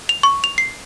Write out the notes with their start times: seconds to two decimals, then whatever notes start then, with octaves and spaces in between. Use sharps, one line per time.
0.09 F7
0.23 C#6
0.44 F7
0.58 C7